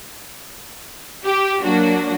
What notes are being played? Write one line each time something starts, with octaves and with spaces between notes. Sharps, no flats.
G4
F#3 A#3 D4 F#4